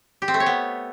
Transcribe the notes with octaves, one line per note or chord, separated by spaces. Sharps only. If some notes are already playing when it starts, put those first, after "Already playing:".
G4
C4
A3
C#5
B3